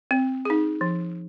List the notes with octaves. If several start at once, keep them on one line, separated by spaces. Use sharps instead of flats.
C4
D#4 G#4
F3